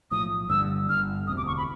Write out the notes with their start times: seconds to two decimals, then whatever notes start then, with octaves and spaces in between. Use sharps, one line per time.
0.11 B1 A2 F3 D#6
0.49 G1 G2 D3 E6
0.89 G1 G2 D3 F6
1.27 E1 D2 C3 D#6
1.37 D6
1.47 C#6
1.57 B5